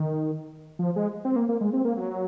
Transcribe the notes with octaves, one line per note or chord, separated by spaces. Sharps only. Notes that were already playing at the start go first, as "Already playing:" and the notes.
Already playing: D#3
F3
G#3
C4
A#3
A#3
G#3
C4
A#3
F#3